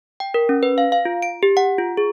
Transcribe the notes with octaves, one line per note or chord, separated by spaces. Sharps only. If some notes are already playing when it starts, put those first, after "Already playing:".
G5
A#4
C#4
B4
F5
F5
F4
D7
G4
F#5
F4
G#4